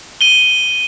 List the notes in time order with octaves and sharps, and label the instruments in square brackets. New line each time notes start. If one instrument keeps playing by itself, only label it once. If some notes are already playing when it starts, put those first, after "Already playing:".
[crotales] D#7 G7